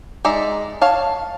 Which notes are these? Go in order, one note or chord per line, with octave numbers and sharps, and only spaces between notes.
G#3 D#4 D5 E5
C#5 F5 A5